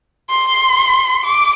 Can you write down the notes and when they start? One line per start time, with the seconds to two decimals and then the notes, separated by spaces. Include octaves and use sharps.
0.30 C6
1.25 D6